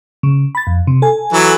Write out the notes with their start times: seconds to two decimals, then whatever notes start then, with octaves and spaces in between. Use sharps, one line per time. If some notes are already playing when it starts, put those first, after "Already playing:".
0.23 C#3
0.55 B5 A6
0.67 F2
0.87 C3
1.02 A4 G#5
1.33 E3 F#3